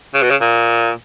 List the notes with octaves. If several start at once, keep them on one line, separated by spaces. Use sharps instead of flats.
C#3
B2
C#3
A#2